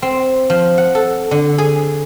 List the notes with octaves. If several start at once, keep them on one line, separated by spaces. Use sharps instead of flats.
C4
F3
F#5
A4
D3
G#4